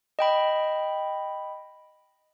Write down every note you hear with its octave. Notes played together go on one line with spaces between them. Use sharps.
D#5 G5 B5